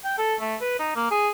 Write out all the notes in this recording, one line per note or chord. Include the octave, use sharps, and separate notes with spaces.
G5
A4
A3
B4
D#4
A#3
G#4